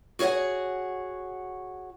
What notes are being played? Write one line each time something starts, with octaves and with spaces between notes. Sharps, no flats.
F#4 G#4 C#5 F5 F#5